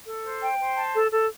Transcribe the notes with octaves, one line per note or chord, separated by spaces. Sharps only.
A4
C5
G5
C5
A5
A4
A4